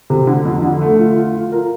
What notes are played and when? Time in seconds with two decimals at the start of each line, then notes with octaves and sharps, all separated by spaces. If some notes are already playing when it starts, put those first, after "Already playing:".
0.10 C3
0.27 D3
0.45 F2
0.62 D3
0.81 A3
0.98 F4
1.17 F4
1.35 F4
1.52 A#4